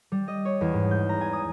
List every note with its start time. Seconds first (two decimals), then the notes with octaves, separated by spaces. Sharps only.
0.12 G3
0.28 D#5
0.45 C#5
0.61 E2
0.73 G#2
0.91 G6
1.09 A#5
1.21 G#5
1.33 D#6